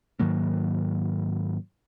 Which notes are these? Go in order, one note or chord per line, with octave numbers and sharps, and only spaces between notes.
G#2 D#3 F#3 A#3